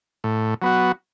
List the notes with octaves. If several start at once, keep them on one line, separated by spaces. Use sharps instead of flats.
A2
F#3 B3 F#4